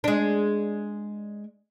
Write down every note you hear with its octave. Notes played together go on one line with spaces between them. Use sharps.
G#3 D4